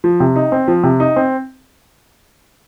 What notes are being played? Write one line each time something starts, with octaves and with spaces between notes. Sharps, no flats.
F3
C3
D#4
C4
F3
C3
D#4
C4